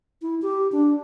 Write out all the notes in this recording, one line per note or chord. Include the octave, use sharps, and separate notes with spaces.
E4
G4
D4